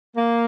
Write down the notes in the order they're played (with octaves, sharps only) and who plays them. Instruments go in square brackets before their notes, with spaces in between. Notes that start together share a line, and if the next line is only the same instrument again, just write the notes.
[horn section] A#3